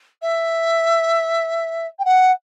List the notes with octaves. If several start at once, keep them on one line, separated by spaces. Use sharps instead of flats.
E5
G5
F#5